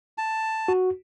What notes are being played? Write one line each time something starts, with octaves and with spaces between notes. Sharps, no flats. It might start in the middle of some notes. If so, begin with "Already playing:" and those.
A5
F#4